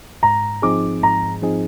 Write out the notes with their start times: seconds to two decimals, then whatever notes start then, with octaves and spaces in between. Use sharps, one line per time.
0.23 G#2 A#5
0.62 F3 C4 D#4 G#4 D6
1.03 G#2 A#5
1.42 F3 C4 D#4 G#4